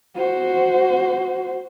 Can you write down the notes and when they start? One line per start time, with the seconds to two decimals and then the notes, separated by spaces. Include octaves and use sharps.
0.15 F#4 C5